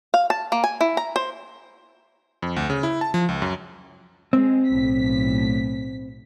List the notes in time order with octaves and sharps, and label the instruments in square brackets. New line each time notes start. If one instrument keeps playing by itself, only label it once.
[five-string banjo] F5
A5
A#3
G#5
E4
A#5
C5
[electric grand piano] F2
D2
C#3
E4
A5
F3
C#2
F#2
[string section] G#3 [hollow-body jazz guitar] C4
[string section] B1 A2 B6